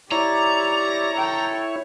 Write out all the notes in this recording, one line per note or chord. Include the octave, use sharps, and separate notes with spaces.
E4 G4 C#5 D5 A#5
A4 G5